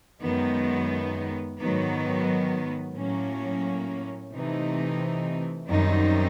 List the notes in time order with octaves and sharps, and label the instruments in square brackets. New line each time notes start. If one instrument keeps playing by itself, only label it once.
[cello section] F#2 D#3 G#3 B3
G#2 D#3 F#3 B3
A2 F#3 A#3 C#4
C3 E3 A3 C4 D#4
F#2 D#3 G3 C4 D#4